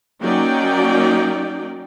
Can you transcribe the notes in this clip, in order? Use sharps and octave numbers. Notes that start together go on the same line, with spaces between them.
F#3 A#3 C#4 D#4 D5 G5